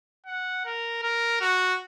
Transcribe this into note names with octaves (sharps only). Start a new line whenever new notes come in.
F#5
A#4
A#4
F#4